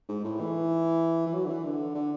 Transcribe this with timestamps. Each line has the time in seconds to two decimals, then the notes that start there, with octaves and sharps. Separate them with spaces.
0.09 G#2
0.24 A2
0.40 E3
1.27 E3
1.34 F#3
1.45 D3
1.49 E3
1.64 D3
1.95 D3